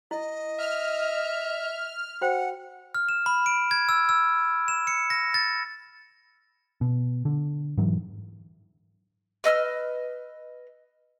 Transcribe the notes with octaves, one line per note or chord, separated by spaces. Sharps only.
E4 D#5
E5 F6
F#4 C5 F#5 G5
F6
E7
B5
D7
G#6
E6
E6
E7
C#7
A#6
A6
B2
D3
G#2 E3 F#3
B4 D#5 E6 F6